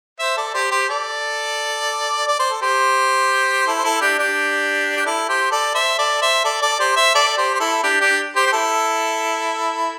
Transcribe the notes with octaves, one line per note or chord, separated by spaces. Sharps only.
C5 E5
A4 D5
G4 C5
G4 C5
A4 D5
D5
C5
A4
G4 C5
E4 A4
C5
E4 A4
D4 G4
D4 G4
G4
E4 A4
G4 C5
A4 D5
C5 E5
A4 D5
C5 E5
A4 D5
A4 D5
G4 C5
C5 E5
A4 D5
G4 C5
C5
E4 A4
D4 G4
D4 G4
G4 C5
G4
E4 A4